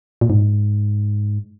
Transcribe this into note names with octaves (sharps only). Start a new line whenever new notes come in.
A#2
G#2